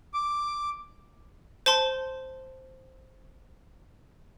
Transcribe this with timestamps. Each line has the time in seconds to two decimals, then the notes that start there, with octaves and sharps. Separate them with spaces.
0.14 D6
1.66 C5 A5 C6